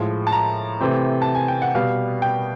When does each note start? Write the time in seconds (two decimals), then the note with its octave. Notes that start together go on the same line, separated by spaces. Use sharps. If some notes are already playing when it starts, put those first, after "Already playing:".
Already playing: A2 F3 G#3
0.27 A5
0.32 A#5
0.81 C3 E3 A3 C4
1.22 A5
1.35 G#5
1.48 G5
1.62 F#5
1.75 B2 G3 B3 F5
2.22 G5